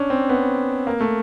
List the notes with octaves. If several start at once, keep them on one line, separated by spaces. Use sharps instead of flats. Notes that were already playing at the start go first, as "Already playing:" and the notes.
Already playing: C#4 D4
C4
B3
A#3
A3